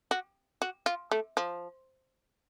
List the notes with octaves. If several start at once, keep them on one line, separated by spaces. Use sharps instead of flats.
F#4
F#4
F4
A3
F3